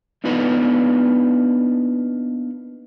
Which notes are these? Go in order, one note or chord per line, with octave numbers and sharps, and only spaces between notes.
A#3 B3 D4 D#4 F4 B4